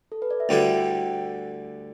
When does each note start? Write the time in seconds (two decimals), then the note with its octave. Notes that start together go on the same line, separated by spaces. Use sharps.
0.12 A4
0.22 B4
0.31 D5
0.40 E5
0.49 D2 D3 G3 E4 G5